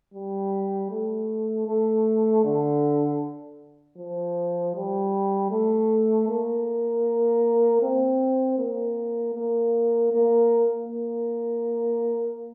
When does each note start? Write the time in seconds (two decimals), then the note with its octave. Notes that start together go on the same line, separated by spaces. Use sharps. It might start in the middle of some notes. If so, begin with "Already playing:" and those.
0.14 G3
0.91 A3
1.68 A3
2.45 D3
3.98 F3
4.75 G3
5.51 A3
6.29 A#3
7.82 C4
8.58 A#3
9.35 A#3
10.13 A#3
10.88 A#3